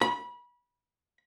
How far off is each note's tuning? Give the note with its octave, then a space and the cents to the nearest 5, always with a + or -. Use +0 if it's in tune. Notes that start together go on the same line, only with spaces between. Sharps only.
B5 -25